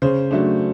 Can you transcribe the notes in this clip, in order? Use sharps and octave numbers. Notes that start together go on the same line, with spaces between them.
C#3 C5
F#3 A3 D4